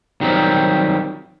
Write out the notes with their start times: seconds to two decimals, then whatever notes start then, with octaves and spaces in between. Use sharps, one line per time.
0.21 D#3 F#3 G3 C4